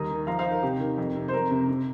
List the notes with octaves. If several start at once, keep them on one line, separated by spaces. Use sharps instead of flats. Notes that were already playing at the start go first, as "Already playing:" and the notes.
Already playing: D#2 G3 A#5 D#6
D#3
F3 F5 A#5
C5 F5
D#4
A#4
C3 G4
D#3
F2
C3
C5
F2 A#4
C3
C3